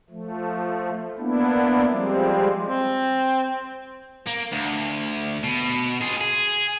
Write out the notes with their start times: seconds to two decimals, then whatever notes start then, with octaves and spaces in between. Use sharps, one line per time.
0.10 F3 A3
1.18 A#3 B3 D4 E4
1.89 F3 G3 G#3 C4
2.67 C4
4.27 A#3
4.52 D2
5.44 B2
6.01 F4 G#4
6.21 G#4